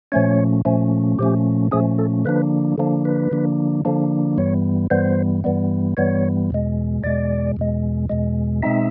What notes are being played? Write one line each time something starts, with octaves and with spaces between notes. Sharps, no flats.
A#2 F3 A3 C#4 C#5
A#2 F3 A3 C#4
A#2 F3 A3 C#4 G4
A#2 F3 A3 C#4 G#4
A4
D3 F3 A#3 D4 B4
D3 F3 A#3 D4
B4
D3 F3 A#3 D4
D3 F3 A#3 D4
G2 E3 G3 B3 C#5
G2 E3 G3 B3 C5
G2 E3 G3 B3
G2 E3 G3 B3 C#5
E2 B2 G#3
E2 B2 G#3 D5
E2 B2 G#3
E2 B2 G#3
B2 G#3 C4 D#4 E5